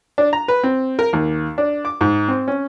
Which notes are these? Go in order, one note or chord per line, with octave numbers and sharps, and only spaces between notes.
D4
A#5
B4
C4
A#4
D#2
D4
D6
G#2
C4
C#4